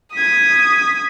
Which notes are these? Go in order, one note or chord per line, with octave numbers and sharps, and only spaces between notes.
D#6 G#6 B6